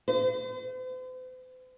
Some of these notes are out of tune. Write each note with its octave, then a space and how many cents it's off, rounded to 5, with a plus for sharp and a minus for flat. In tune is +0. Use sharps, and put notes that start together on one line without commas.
C5 -45